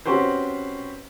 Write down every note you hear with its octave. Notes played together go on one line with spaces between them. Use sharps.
C4 C#4 F#4 G4 B4 C5